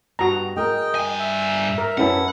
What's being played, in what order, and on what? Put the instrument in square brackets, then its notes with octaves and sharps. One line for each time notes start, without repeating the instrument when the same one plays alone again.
[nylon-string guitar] G2 [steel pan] F#4 A#5
[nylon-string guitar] G#4 A#4 [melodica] D#5 G5
[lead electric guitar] G2 G#5
[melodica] E5
[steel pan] A#4
[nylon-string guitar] F#2 B4 A5 [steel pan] C#4 E4 [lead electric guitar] F#5